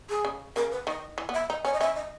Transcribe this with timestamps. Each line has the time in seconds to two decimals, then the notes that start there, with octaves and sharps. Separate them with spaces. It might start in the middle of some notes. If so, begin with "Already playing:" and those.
0.10 G#4
0.25 C#3
0.56 C#3 A#4
0.72 B4
0.87 D#3 D#5
1.18 E3
1.29 B3
1.34 E5
1.49 D#4 D#5
1.65 C#4 C#5
1.73 D#5
1.80 C#4 E5
1.96 D#5